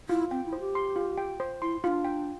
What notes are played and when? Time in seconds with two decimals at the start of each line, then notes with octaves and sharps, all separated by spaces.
0.09 E4 F4
0.31 C4 G5
0.46 E4
0.53 C5
0.60 G4
0.75 C6
0.96 F4
1.18 G5
1.40 C5
1.61 E4 C6
1.83 D4 E4 F4
2.04 G5